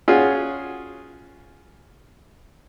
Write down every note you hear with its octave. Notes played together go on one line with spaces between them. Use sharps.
C#4 F4 F#4 G#4